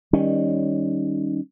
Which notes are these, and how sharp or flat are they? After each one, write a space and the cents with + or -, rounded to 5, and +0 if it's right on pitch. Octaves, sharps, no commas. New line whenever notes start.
D#3 -5 G3 +0 C#4 +0